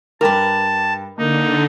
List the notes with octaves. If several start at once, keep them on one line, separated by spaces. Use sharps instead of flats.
G2 A#4 B4 G5 A5 D6
D3 A#3 D#4